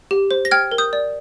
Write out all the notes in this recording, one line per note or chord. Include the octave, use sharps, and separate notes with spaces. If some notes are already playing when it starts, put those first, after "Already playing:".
G4
C5
A#6
G5 F6 G#6
A#4
D#6 G6
D5